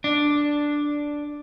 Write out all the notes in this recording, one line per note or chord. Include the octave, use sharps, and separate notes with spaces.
D4